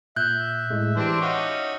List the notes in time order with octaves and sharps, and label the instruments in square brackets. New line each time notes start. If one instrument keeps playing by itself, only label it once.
[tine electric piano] A#2 [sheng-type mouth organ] E5 [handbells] F#6 G6
[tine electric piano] A2 G#3 A3
[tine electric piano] E3 G4 [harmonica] C4 D4 C5
[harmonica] C#4 D#4 F#4 [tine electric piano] F5 D6